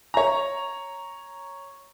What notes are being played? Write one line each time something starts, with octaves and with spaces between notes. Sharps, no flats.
C#5 A#5